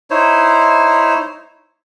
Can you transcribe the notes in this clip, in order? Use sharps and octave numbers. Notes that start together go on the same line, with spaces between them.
D#4 E4 C5 C#5